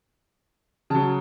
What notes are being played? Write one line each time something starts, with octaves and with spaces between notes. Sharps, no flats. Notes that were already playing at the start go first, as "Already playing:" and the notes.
C#3 F#3 A5